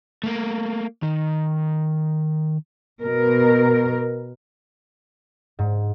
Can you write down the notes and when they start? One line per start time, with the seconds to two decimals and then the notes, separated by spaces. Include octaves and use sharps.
0.24 A3 A#3
1.03 D#3
3.02 B2 A#4
5.59 G#2